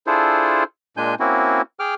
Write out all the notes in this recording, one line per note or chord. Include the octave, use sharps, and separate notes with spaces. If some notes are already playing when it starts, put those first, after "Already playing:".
D4 E4 F4 G#4 A4 C5
A#2 G#3 D4 G#5 G6
A#3 C4 C#4 E4 F#4
G#4 G5 D6 F6